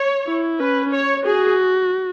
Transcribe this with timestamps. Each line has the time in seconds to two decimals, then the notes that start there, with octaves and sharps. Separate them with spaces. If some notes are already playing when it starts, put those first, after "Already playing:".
Already playing: C#5
0.28 E4
0.60 C#4 B4
0.94 C#5
1.26 F#4 G#4